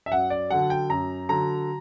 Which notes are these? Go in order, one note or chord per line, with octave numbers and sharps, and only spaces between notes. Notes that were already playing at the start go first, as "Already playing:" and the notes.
E5
F#2 F#5
D5
D3 F#3 F#5
G5
F#2 A#5
D3 F#3 A#5